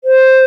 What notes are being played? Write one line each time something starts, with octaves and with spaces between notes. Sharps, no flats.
C5